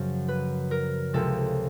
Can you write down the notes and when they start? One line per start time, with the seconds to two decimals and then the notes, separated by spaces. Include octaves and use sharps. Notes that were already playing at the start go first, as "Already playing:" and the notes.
Already playing: F#2 C#3 F3
0.28 B4
0.71 A#4
1.13 C#2 C3 F3 A4